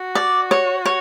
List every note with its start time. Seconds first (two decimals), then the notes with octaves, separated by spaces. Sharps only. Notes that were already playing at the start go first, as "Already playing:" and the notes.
Already playing: F#4
0.15 D5
0.51 C#5
0.85 C#5